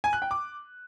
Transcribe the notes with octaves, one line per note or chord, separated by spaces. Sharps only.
G#5
F#6
G5
D6